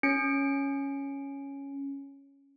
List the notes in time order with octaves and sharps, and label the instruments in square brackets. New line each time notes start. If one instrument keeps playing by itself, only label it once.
[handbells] C#4 C#7 D7